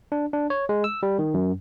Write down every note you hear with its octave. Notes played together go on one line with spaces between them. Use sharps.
D4
D4
C#5
G#3
E6
G3
D#3
F#2